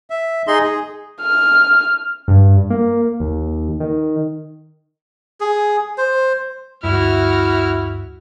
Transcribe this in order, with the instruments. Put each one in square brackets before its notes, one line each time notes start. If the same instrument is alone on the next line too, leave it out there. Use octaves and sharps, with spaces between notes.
[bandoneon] E5
D#4 G#4 D#5 C6
G#4
[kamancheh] F6
[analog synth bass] G2
A#3
D#2
D#3
[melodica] G#4
C5
[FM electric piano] D2 G2 [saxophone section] E4 [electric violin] F#4 F6